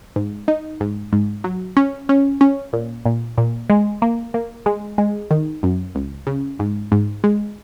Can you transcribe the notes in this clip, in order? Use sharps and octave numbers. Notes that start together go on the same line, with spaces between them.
G#2
D#4
G#2
G#2
F#3
C#4
C#4
C#4
A#2
A#2
A#2
G#3
A#3
A#3
G#3
G#3
D#3
F#2
C#2
C#3
G#2
G#2
G#3